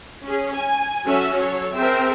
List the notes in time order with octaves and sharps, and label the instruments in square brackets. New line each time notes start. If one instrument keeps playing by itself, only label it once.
[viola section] C#4 G#4
G#5
F#3 C#4 F#4 A4 E5
F#3 A4 C#5
C4 G#4 A#4 C5 E5 G5